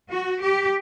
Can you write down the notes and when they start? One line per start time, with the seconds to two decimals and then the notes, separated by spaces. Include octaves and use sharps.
0.13 F#4
0.42 G4